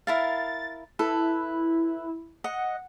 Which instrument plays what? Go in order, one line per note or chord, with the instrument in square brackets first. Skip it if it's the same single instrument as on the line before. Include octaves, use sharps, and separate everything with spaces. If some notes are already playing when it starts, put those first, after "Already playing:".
[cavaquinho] E4 A#4 F5 [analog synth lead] A6
[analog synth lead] E4 [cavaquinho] A4 B4
[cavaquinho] D#5 [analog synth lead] F#5